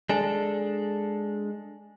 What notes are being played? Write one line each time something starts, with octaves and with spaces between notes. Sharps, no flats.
G#3 D4 A4 G#5